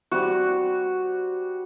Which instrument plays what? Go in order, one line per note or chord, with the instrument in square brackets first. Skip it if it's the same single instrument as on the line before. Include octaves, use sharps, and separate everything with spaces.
[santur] G3 C4 F#4